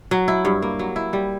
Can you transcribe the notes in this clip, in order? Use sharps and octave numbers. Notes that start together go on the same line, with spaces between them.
F#3
E4
G2
A#3
F#3
E4
G3